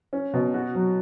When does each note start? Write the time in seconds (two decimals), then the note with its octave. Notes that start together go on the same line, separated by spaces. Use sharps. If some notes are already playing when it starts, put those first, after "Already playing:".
0.13 C#4
0.34 B2
0.54 F#4
0.75 F#3